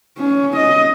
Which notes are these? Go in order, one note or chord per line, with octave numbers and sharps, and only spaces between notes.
C#4
D#5